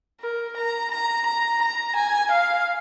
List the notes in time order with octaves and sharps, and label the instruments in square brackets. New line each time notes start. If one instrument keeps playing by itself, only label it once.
[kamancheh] A#4
A#5
A#5
A#5
A#5
G#5
F5